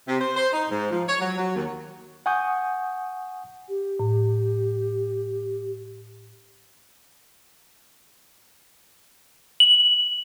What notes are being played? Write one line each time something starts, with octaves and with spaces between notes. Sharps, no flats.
C3
C5
C5
D#4
G#2
F3
C#5
F#3
F#3
D#2
F#5 G#5 C#6 D#6 G6
G4
A2
F#7